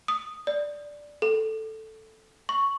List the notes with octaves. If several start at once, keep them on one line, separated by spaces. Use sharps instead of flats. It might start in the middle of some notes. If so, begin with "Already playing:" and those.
D#6
D5
A4
C#6